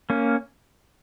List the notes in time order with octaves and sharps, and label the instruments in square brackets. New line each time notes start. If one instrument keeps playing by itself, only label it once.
[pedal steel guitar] A#3 C#4